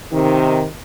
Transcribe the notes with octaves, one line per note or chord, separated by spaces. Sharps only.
C3 D#3